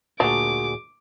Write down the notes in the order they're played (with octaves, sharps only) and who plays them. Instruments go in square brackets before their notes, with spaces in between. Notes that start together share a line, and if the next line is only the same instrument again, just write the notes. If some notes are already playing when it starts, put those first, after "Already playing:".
[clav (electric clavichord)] D2 A#2 [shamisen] D4 [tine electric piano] F#4 G#4 [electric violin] D6